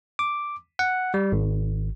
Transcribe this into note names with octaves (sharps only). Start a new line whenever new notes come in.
D6
F#5
G3
G#1